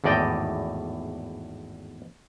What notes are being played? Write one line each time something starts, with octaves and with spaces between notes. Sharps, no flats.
G#1 E2 A2 D5 D#5 G5